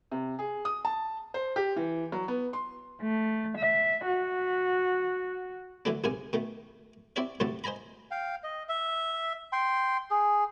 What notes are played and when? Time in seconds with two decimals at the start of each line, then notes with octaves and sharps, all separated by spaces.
0.12 C3
0.39 G#4
0.65 D#6
0.85 A5
1.34 C5
1.56 G4
1.76 E3
2.12 F#3
2.28 B3
2.53 C6
3.00 A3
3.57 E5
4.07 F#4
5.85 D3 E3 F#3 A3 D4
6.04 B1 G#2 C3 A#4 G#5 D#6
6.33 B2 D#3 A3
7.16 C4 E4 G4 C#5 D5 E5
7.40 D#2 A2 C3 F#3 A3 A5
7.64 C5 D#5 G#5 A#5 B5
8.11 F5 G5
8.43 D#5
8.69 E5
9.52 G5 C6
10.11 G#4